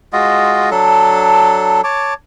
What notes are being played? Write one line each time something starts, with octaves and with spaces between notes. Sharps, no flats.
G#3 F4 F#4 D#5
F#3 D4 A4
C#5 A5 D6